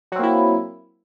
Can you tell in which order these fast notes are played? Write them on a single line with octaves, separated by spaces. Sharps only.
F#3 C4 A#3 E4